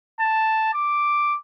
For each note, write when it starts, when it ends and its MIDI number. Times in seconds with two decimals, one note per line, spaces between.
0.19 0.70 81
0.73 1.36 86